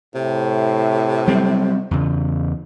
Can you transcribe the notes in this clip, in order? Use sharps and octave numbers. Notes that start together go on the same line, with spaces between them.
A2 C3
F#3 G3 C4
E2 C#3